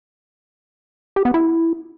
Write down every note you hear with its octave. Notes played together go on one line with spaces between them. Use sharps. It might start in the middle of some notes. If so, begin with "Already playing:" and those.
G4
B3
E4